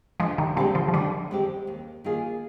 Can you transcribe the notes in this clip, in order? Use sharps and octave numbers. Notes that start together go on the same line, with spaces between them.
D3 F3 G#3
D#3 G3
A#2 D3 G#3 C4 G4
D3 F3
F3
D3 D#3 G3
G#3 C4 G4
D#2
D#3 A#3 F4 G#4